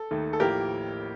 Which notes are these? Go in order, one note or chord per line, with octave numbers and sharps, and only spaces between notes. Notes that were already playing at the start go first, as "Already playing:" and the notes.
Already playing: A4
D#2 D#3 A3
A4
A1 A2 F3 A#3 G4 A#4